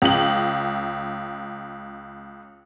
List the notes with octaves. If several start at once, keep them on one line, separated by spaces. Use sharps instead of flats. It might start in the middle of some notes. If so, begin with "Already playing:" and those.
C#2 F#7